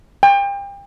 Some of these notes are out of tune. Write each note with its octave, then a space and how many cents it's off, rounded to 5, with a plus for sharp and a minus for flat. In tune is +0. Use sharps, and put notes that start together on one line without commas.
G5 +35